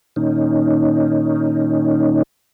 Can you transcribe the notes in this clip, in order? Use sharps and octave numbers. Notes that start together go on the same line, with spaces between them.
A#2 D#3 C#4 D#4